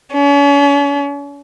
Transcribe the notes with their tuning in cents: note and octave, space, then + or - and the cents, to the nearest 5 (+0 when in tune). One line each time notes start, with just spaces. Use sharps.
C#4 +40